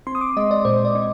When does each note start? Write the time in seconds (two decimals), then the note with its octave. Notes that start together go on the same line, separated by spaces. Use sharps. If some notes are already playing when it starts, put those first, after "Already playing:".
0.07 C4 C6
0.15 D#6
0.21 D6
0.37 G#3 D#5
0.51 D5
0.65 A#2 C5
0.85 D5
0.95 C4